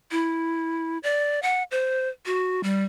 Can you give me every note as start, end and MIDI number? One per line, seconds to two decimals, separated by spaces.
0.11 0.98 64
1.03 1.40 74
1.43 1.63 78
1.71 2.08 72
2.26 2.61 66
2.63 2.84 55